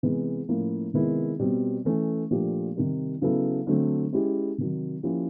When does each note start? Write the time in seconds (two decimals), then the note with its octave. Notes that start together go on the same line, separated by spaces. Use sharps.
0.03 C3 E3 G#3 B3
0.49 A2 F3 A#3 C#4 E4
0.94 C3 D#3 G#3 B3 E4
1.39 B2 G3 C4
1.85 E3 A3 C#4
2.31 A#2 F3 A3 D4 G4
2.76 C3 D#3 G3
3.22 C#3 F#3 B3 E4 A4
3.67 D3 F#3 A3 C4
4.13 G#3 C#4 E4 G4
4.58 C3 D#3 F#3
5.03 F3 A#3 C#4 E4 G4